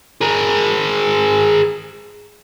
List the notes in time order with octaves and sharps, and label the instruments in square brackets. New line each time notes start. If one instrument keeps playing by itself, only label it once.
[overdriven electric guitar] G#4 A#4